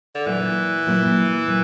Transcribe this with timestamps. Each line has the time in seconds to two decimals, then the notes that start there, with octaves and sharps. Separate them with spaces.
0.15 D3
0.26 A#2 E3 F#3 A#3 E4
0.87 A#2 F#3 A#3 E4
1.47 A#2 F#3